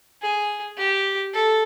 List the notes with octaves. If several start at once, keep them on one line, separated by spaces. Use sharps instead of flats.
G#4
G4
A4